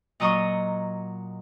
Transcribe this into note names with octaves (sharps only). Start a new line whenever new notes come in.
A#2 F#3 D#5 A#5 C#6 D#6